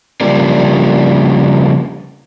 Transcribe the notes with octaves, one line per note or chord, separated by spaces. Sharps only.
C#3 F3 G3 A#3 D4